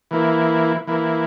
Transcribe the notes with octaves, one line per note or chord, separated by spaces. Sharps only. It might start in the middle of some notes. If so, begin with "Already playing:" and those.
E3 A#3 E4
E3 A#3 E4